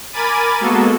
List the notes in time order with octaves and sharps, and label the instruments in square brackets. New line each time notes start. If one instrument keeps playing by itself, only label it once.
[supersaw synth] A#4 G#5 B5 D6 A6 D#7
G#3 A#3 B3 F#4 A4